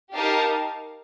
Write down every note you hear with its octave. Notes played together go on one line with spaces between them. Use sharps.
D#4 G4 A#4 F5 A5